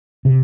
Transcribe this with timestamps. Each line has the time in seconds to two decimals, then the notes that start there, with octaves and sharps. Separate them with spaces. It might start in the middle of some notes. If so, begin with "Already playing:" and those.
0.25 C3